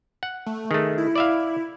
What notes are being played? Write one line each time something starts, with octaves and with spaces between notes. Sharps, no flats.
F#5
A3
D#3 A3 G#4
E4
D5 E5 F5